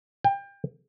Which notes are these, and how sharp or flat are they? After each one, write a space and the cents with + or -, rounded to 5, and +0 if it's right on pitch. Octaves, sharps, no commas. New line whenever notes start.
G5 +30